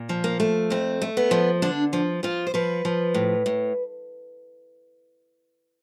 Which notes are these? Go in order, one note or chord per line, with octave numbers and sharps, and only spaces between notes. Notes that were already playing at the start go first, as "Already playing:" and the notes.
Already playing: A#2
F3
A#3
A3
F2 C4
A3
B3
F3
D3 D4
F3
F3 F4
C5
F3 B4
F3
A2
A2